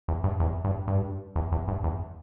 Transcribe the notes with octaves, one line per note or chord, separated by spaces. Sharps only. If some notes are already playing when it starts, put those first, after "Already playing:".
E2
G2
E2
G2
G2
E2
E2
G2
E2